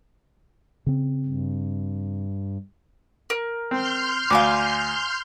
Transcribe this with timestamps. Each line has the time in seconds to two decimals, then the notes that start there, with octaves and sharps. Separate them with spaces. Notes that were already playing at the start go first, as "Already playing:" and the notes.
0.86 C#3 C4
1.26 G2
3.30 A#4
3.71 C4 C6 F6 G6
4.30 D2 F5 G#5 D6